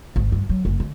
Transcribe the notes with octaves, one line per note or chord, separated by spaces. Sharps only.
G#1
G2
F#3
F#1
D3